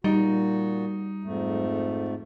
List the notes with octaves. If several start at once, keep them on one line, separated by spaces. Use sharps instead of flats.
A#2 G3 D#4 F#4
F2 G#2 A3